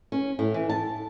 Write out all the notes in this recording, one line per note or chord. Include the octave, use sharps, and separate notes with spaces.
C#4
A2
E3
A5